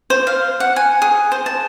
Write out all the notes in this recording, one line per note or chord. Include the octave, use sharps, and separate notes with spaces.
C5
F5
F#5
G#5
G#4
C5
A5